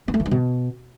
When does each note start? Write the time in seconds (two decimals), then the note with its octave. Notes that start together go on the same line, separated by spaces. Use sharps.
0.08 B3
0.14 A3
0.20 E3
0.26 G2
0.31 B2